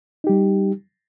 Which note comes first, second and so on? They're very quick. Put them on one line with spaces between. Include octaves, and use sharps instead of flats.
D#4 G4 G3